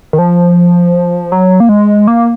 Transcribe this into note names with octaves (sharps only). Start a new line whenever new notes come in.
D#3
F3
F#3
A#3
G#3
A#3